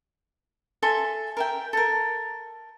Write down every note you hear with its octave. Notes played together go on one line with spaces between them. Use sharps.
A4 E5 G#5 C6
A#4 E5 G5
A4 A#4